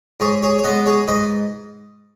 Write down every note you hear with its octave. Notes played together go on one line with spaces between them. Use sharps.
G#2 G#4 C#5
G#4 C#5
C#5
G#3 B3 B4 D#5
G#4 C#5
G#2 B4 D#5